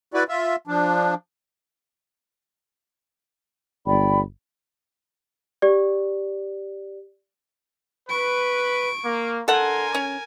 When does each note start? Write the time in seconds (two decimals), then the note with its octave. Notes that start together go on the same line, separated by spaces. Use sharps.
0.14 E4 F#4 B4 D5
0.28 F4 E5
0.67 F3 D4
3.86 G1 D5 G5 B5
5.62 G4 D5
8.09 B4 C#6 D7
9.05 A#3
9.48 D4 A4 A#4 F#5 G#5 A#5 C6
9.95 C#4